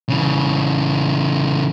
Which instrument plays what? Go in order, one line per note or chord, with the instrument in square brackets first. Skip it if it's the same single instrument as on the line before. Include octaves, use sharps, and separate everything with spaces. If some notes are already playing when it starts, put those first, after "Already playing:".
[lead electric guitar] C#3 E3